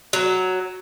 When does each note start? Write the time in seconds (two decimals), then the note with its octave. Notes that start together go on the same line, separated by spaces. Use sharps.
0.13 F#3